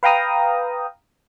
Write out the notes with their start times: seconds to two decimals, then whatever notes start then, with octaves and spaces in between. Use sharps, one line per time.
0.03 B4 F5 G5 A#5 D#6